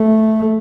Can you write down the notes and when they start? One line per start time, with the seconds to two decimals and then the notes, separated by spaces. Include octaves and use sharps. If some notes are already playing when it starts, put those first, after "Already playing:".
Already playing: A3